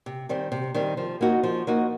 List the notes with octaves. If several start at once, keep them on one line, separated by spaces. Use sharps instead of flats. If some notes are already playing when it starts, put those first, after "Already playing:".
C3
D#3 G3 C4
C3
D#3 G3 C4
F3
A#3 D#4 F#4
F3
A#3 D#4 F#4